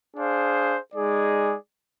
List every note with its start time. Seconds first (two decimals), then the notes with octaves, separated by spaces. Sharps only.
0.15 D4 G#4 C5 F5
0.93 G#3 D#4 G#4 D5